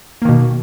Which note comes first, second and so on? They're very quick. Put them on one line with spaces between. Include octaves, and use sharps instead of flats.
A#3 D#3 B2